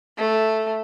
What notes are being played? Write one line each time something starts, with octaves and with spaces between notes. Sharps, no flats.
A3